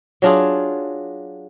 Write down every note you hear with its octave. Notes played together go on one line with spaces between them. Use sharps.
F#3 D4 F4 G#4